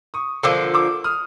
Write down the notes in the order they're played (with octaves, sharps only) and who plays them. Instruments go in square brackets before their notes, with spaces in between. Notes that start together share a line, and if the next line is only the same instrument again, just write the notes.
[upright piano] C#6 D#6
[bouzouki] D3 F3 A#3 [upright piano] D6 E6
[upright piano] D6 E6
D#6 F6